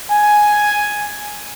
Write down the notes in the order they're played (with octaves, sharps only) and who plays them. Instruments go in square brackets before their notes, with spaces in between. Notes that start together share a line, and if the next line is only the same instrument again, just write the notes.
[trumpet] G#5